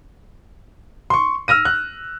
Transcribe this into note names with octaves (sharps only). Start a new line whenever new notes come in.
C6 C#6
E6 F6 A#6 D#7
F#6